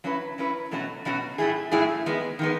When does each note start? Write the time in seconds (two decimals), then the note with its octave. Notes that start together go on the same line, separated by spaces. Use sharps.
0.04 F#3 C#4 E4 B4
0.38 F#3 C#4 E4 B4
0.71 B2 F#3 A3 C#4 F#4
1.05 B2 F#3 A3 C#4 F#4
1.38 A2 F#3 A3 E4 G#4
1.72 A2 F#3 A3 E4 G#4
2.06 D#3 G#3 B3
2.39 D#3 G#3 B3